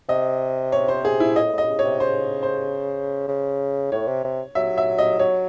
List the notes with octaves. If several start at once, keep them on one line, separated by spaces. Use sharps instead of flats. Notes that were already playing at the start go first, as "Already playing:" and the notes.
C3 D#5
C#5
C5
G#4
E4
A2 D#5
A2
D#5
C#3
C#5
C3
C#3 C5
C5
C#3
A2 C#5
C3
C3
F#3 E5
E5
D#5
F#3 C#5